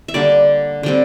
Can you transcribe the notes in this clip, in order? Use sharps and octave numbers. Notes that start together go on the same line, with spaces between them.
E5
D3 G3 A#3 D5
D3 G3 C4